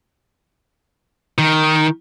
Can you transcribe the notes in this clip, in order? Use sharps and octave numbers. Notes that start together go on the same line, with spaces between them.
D#3